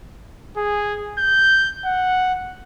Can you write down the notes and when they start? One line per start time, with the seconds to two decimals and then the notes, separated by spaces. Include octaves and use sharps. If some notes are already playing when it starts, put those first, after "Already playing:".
0.57 G#4
1.19 G6
1.86 F#5